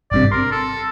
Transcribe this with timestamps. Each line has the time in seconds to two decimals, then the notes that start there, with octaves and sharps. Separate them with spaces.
0.11 G#1 G2 C3 D5
0.32 A#4 C6
0.52 A4